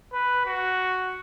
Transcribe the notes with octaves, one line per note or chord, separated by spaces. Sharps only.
B4
F#4